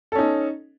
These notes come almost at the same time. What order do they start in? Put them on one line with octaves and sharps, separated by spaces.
A4 C#4 D#4